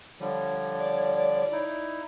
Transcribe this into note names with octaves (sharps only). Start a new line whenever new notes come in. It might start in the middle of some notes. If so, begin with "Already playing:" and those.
D3 F3 G3 C#5
D5
D#4 E4